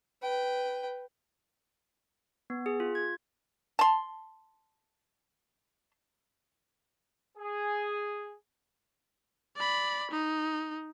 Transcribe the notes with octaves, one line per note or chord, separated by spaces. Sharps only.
B4 G5
B3
G#4
F4
G#6
A5 C6
G#4
D5 B5
D#4